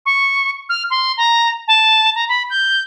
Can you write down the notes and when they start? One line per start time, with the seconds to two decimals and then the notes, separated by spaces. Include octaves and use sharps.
0.06 C#6
0.69 F6
0.90 C6
1.17 A#5
1.68 A5
2.15 A#5
2.29 B5
2.50 G6